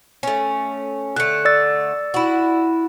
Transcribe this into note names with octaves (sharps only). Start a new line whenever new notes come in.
A3 C#4
D3 A3 F#6 C#7
D5 E6 A6
E4 F#4